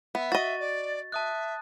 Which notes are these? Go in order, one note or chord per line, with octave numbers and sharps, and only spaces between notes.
B3 E5
F#4 D#5 A6
D5
E5 A5 D#6 F#6